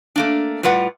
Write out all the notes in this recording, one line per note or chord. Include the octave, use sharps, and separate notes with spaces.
A3 A#3 D4
A2 G3 F4 B4 F#5